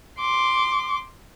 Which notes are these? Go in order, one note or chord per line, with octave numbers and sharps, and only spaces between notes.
C6 D6